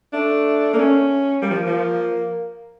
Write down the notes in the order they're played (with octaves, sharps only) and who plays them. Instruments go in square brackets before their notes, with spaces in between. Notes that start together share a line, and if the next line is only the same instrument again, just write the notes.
[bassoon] A3 [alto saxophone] D4
[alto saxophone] A#3
C#4
[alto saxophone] G3 [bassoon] A#3
[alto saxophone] F3
F3